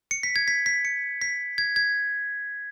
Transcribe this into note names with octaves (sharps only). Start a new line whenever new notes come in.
C#7
B6
G#6
B6
B6
C#7
B6
G#6
G#6